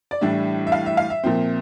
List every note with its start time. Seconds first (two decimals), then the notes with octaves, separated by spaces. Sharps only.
0.11 D5
0.21 A2 E3 G3 D4 E5
0.67 E5
0.72 F5
0.86 E5
0.97 F5
1.10 E5
1.23 A#2 F3 C4